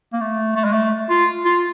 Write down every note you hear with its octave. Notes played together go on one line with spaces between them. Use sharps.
A#3
A3
A3
G#3
A3
F4
F4